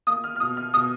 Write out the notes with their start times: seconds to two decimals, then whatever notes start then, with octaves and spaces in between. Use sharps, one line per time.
0.07 A#3 D#6
0.24 F6
0.36 F6
0.40 B2 D#6
0.57 F6
0.74 B2 D#6